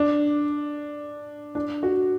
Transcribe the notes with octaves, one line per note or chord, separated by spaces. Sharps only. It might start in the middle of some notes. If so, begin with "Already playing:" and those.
Already playing: D4
D4
F#4